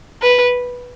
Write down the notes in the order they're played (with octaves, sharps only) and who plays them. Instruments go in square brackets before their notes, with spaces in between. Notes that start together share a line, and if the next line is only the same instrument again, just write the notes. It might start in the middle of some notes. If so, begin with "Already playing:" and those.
[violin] B4